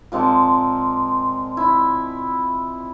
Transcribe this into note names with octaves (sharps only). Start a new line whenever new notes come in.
A#2 G#3 C4 A5
E4